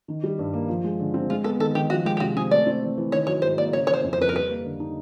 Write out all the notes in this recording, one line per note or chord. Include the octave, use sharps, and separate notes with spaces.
D#3
G3
G2
A#3
F3
G#3
D3
C4
G#3 F4
B3 A4
D#3 A4
D#3 G4
F3 F#4
G#3 G4
G4
C3 F#4
C4 G#4
A3 D5
C4
E3
E3
D#3 C#5
F#3 C#5
G#2 C5
A#3 D5
C#3 C#5
E3 C#5
C5
F2
C5
F2 B4
A#4
G3 B4
A#3
D3
D#4